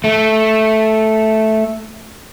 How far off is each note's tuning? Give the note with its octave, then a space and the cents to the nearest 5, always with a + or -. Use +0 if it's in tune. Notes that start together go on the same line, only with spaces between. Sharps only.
A3 -5